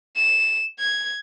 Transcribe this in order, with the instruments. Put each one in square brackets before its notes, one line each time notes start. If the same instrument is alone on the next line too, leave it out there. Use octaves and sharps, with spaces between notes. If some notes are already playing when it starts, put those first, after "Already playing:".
[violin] E7
G#6